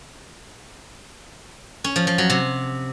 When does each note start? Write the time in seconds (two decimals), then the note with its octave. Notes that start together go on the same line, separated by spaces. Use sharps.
1.84 C#4
1.96 F3
2.07 F3
2.18 F#3
2.30 C3